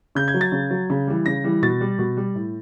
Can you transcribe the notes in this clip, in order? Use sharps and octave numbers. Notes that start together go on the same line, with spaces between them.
C#3 G6
G#6
F#3
A6
C#3
F#3
C#3
E3 G3
C#3 A#6
E3 G3
B2 A6
G3
B2
G3
A2